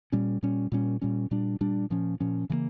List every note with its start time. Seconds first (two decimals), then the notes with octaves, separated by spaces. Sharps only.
0.12 A#2 G3 C#4
0.43 A#2 G3 C#4
0.72 A#2 G3 C#4
1.02 A#2 G3 C#4
1.31 A#2 G3 D4
1.61 A#2 G3 D4
1.90 A#2 F3 C#4
2.20 A#2 F3 C#4
2.50 C#3 E3 G3 A#3